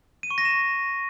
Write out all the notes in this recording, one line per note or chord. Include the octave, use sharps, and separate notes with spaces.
D#7
C#6
A#6
E7